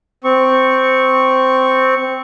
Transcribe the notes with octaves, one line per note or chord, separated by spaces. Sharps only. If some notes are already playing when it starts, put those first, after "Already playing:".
C4 C#6